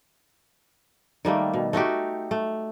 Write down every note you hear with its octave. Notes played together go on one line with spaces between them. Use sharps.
D#3 G3 A3 A#3
B2
A3 D#4 F#4 G4
A3